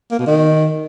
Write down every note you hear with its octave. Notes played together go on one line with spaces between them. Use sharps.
A#3
B2
D#3